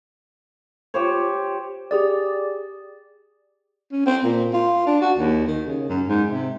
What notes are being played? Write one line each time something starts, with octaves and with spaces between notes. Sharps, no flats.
G4 C5 C#5
G4 G#4 D5
C#4
C4
A#2
F4
D4
F#4
D#2
D#3
C#3
F#2
G#2
C3